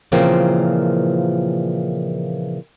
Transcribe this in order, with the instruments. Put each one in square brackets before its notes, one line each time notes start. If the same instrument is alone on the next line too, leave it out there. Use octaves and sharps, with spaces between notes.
[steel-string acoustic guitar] A#2 C#3 E3 F3 A#3 C4